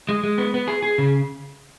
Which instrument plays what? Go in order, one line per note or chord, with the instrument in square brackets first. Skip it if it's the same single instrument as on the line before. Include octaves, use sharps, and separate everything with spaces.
[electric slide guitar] G#3
G#3
B3
B3
G#4
G#4
C#3